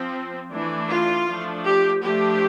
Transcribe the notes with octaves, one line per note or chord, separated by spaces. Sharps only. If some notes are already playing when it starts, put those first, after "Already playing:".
Already playing: F3 C4
E3 A3 D4
F4
F3 A3 D4
G4
F3 A3 D4 G4